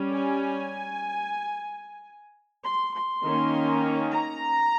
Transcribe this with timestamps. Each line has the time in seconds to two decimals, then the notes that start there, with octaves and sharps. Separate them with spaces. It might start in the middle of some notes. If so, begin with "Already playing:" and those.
Already playing: G3 C#4
0.14 G#5
2.64 C6
2.95 C6
3.24 D#3 A#3 C#4
4.13 A#5